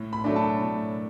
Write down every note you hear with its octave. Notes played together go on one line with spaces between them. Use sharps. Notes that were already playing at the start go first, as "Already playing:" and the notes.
Already playing: A2
B5
F#3 A3 D4
A5
A2